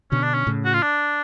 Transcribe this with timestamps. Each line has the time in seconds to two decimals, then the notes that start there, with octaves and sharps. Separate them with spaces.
0.11 B2 D3 C#4
0.23 D4
0.34 C#4
0.47 A2 C#3
0.65 F#4
0.74 F4
0.82 D4